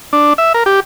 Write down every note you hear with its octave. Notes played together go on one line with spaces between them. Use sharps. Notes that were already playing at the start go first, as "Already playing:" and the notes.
D4
E5
A#4
G4